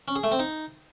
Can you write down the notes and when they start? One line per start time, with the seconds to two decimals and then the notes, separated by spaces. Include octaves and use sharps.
0.08 C#4
0.16 G#4
0.24 A3
0.31 C4
0.39 D#4